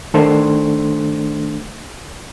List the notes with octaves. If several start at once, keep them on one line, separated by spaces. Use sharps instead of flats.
D#3 A3 D4 A4 C5 C6